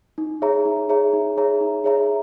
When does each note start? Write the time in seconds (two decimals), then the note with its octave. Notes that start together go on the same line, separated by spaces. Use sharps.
0.18 D#4
0.42 G#4 C#5 E5 A#5
0.65 D#4
0.89 G#4 C#5 E5 A#5
1.13 D#4
1.37 G#4 C#5 E5 A#5
1.61 D#4
1.84 G#4 C#5 E5 A#5